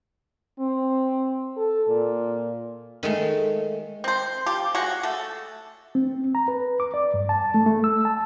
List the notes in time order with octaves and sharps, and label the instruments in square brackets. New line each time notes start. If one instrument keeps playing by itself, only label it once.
[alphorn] C4
A4
A#2
[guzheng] D#3 G#3 A3
[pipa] C4 C5
F3 G4
G#3 F#4
A3 A4
[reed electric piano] C4
A#5
B4
D6
D5
G2
A5
A3
A3
E6
A5